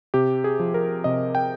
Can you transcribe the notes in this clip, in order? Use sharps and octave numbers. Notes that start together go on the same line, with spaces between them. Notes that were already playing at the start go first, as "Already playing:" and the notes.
C3 G4
G#4
F3
A#4
C3 D#5
G5